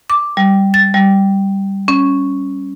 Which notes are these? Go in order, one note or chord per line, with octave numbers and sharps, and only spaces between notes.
D6
G3
A6
G3
C#4